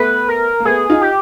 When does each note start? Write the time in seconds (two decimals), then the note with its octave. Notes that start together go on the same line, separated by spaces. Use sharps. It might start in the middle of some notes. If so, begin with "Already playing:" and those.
Already playing: A3 B3 B4
0.29 A#4
0.60 A#3
0.65 A3 B3 G#4
0.89 D#4 F4
1.02 G4